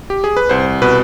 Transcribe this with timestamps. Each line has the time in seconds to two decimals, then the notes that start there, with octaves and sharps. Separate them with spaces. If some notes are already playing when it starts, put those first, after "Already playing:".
0.10 G4
0.24 G#4
0.37 B4
0.49 C2 C5
0.82 B2 B4